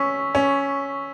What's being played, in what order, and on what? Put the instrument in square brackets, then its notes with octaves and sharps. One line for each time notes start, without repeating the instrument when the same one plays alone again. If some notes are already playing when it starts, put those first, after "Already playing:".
Already playing: [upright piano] C#4 [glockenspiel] C#6 E6 B6
[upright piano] C#4